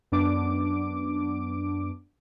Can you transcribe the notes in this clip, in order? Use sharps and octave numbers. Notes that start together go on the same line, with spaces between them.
F#2 B3 D4 D6 D7